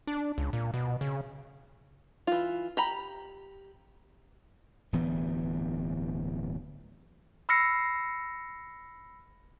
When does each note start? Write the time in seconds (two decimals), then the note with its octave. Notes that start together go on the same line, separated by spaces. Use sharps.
0.07 D4
0.38 C#2
0.53 A#2
0.74 B2
1.01 C#3
2.27 E3 F4
2.77 G4 A#5 B5
4.93 D1 G2 E3 B3
7.49 B5 E6 F6 A#6 C7 C#7